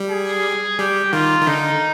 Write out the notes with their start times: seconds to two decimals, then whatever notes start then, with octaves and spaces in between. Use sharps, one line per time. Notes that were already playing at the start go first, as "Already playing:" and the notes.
Already playing: G3
0.10 G#4
0.79 G3 G4
1.12 D#3 F4
1.41 D#3
1.47 D3 D#4